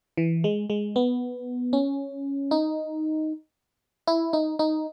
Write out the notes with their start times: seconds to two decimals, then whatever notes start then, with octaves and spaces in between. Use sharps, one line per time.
0.17 E3
0.44 G#3
0.70 G#3
0.96 B3
1.73 C#4
2.51 D#4
4.07 E4
4.33 D#4
4.59 D#4